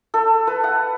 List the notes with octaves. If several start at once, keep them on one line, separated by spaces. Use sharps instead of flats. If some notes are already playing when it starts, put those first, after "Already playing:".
A4
B4
F#5